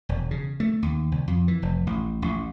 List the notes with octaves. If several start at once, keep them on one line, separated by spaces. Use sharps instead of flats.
E1
C#3
A3
D#2
C2
F2
E3
F1
A1
A1